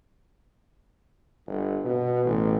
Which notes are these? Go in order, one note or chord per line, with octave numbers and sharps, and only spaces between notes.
G1
B2
A1